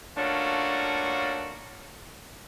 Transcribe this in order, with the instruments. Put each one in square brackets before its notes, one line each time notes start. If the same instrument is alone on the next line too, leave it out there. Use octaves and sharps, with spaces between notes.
[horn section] A3 A#3 C#4 D4 F4 F#4